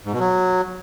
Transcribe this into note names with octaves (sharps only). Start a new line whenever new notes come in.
G#2
B2
F#3